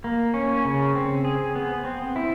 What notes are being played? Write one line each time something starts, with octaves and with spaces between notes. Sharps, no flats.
A#3
C#4
C#3
C4
G#4
B3
C4
E4